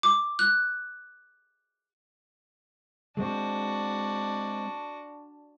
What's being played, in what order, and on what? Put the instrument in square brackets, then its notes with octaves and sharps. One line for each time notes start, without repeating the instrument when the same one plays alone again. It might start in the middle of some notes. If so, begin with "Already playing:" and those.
[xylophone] D6
F#6
[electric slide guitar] G#3 C4 [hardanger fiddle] D4 F#4